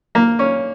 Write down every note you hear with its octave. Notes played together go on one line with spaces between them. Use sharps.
A#3
C#4